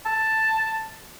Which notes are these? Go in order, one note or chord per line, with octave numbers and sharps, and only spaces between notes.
A5